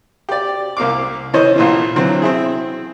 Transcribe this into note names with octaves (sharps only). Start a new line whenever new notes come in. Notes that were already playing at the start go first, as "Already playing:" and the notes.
G4 D5
C2 A#3 F5 D6
E3 C#4 C5 C#5 D#5
A#1 A#2 E3
D3 E3 F#3 C4
C4 E4 G#4